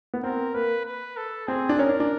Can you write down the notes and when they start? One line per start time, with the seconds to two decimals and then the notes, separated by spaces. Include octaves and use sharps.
0.14 B3
0.24 C4 A#4
0.55 A#3 B4
0.86 B4
1.17 A4
1.48 C4 G#4
1.69 D4
1.79 C#4 A#4
1.89 D4
2.00 D4